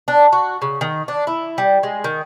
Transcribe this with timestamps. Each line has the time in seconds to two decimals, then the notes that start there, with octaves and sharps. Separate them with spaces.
0.08 D4
0.33 F#4
0.62 C#3
0.81 D#3
1.08 D4
1.27 E4
1.58 G3
1.83 G#3
2.04 D#3